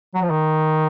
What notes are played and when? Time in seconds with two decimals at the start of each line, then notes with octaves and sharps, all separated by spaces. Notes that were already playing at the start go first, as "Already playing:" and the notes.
0.15 F#3
0.22 F3
0.30 D#3